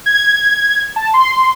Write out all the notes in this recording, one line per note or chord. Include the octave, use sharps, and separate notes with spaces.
G#6
A5
C6